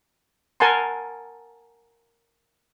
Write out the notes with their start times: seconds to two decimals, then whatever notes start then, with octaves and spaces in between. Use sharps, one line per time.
0.60 A#4 F#5 G#5 A5 C6